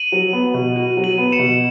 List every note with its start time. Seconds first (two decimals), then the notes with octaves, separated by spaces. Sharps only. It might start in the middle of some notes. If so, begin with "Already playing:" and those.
Already playing: D#7 F#7
0.12 F#3
0.33 B3
0.54 B2
0.76 F#4
0.97 F#3
1.04 D#7 F#7
1.18 B3
1.32 C#7 E7
1.39 B2